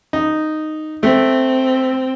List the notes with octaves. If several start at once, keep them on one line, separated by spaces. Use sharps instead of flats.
D#4
A3 C4